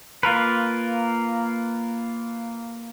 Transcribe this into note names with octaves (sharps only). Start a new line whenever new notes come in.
A#3 F4 A#4 B4